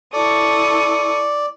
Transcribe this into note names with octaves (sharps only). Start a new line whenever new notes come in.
E4 A4 D5 C#6 D#6